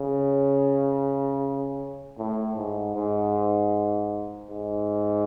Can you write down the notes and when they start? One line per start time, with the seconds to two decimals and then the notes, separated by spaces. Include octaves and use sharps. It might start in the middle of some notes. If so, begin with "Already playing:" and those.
Already playing: C#3
2.18 A2
2.57 G#2
2.95 G#2
4.50 G#2